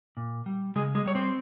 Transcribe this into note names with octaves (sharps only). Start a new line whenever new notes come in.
A#2
G3
C#3 G#3 G#4
G#3 G#4
G3 C#5
C4 C5